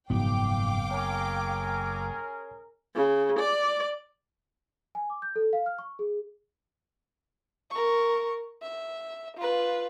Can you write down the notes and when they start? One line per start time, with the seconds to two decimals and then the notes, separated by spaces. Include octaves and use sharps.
0.10 F#1 G#2 B2 F3 B3 F5 G5 D6
0.91 C#4 G#4 A#4 C#5
2.95 C#3
3.39 D5
4.95 G#5
5.10 D6
5.22 G6
5.36 A4
5.53 F5
5.66 F6
5.79 C#6
5.99 G#4
7.71 A#4 C#6
8.62 E5
9.37 F4 B4